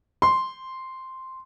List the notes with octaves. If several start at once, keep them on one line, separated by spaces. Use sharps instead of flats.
C6